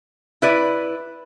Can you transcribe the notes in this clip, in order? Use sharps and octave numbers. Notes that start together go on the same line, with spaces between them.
E4 B4 D5